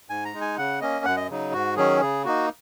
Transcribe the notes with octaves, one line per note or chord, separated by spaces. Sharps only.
G#2 G#5
A#5
G#3 D#4
G#5
C#3 F#5
A#3 C#4 D#5
F#2 F#5
D#5
C#3 F#3 D#4
G#2 F#4
D#3 F#3 C#4 G#4
C#3 G#4
A#3 D#4 F#4